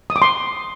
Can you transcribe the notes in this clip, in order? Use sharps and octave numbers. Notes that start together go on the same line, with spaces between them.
D#6
D6
C6